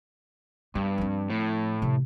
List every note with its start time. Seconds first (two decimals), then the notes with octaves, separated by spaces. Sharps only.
0.75 G2 B3
0.98 F3 C4
1.30 A2
1.82 C3 F3